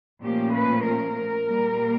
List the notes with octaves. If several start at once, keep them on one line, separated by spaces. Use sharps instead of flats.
A#2 F3 A3 C#4 G4
B4
A#4
A#2 G3 A#3